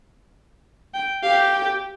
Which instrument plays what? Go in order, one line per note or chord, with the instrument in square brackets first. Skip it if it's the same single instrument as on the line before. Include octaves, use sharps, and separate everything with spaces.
[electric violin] G5
[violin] G4 [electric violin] F5
[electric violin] G5